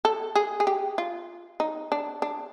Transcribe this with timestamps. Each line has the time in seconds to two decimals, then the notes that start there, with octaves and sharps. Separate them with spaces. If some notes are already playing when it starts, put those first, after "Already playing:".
0.05 A4
0.35 G#4
0.60 G#4
0.67 G4
0.98 F4
1.60 D#4
1.92 D4
2.22 D4